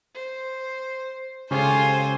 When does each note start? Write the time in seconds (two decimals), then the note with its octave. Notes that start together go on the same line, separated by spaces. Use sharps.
0.14 C5
1.51 C#3 G#3 F4 G4 A4 C5 C#5 G#5